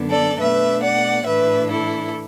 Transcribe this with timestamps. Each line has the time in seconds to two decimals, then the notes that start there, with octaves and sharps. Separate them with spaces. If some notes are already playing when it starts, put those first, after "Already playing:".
Already playing: F#2 D3 B3 D4
0.10 A4 D5
0.40 B2 A3 D4 B4 E5
0.83 D5 F#5
1.26 A2 E3 D4 B4 E5
1.71 E4 A4